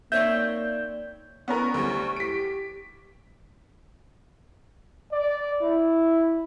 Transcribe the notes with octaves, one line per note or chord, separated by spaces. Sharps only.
A#3 C4 D#4 C#5 D5 E5 C#6 G6
B3 C#4 A#4 C#6
D2 G3
G4 B6 D7
D5
E4